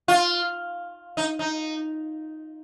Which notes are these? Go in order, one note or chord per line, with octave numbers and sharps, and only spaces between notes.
F4
D#4
D#4